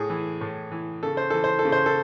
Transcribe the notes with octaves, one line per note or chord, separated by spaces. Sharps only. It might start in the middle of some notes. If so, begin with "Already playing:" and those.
Already playing: A2 G#4
E3
A2
E3
C#3 A4
C5
E3 A4
C5
A4
C#3
C5
A4